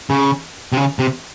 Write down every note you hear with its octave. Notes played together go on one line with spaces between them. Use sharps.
C#3
C3
C#3
C3